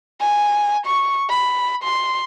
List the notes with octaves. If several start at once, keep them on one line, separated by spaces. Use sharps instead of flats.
G#5
C#6
B5
C6